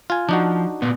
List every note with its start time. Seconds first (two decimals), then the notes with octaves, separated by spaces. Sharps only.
0.10 F4 G#5
0.29 F3 D4 D#4 F#4
0.82 A#2 B3